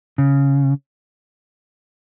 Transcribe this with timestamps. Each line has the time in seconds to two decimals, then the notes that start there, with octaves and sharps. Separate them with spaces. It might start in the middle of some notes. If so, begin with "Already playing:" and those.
0.18 C#3